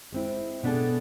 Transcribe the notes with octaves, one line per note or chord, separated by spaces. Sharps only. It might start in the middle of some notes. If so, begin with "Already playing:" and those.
G#3 C4 E4
B2 B3 D4 G#4 A4